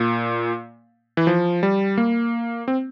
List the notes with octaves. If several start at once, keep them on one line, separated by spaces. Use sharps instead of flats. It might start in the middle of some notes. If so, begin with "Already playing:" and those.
Already playing: A#2
E3
F3
G3
A#3
C4